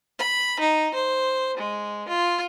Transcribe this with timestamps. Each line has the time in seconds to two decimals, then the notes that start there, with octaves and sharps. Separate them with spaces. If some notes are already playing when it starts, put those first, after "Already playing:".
0.19 B5
0.60 D#4
0.94 C5
1.57 G#3
2.08 F4